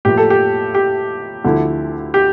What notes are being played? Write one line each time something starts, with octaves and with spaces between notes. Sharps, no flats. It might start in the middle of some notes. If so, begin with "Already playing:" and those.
A2 F3 A#3 G4
A4
G4
G4
D2 D3 F3 A3 E4
G4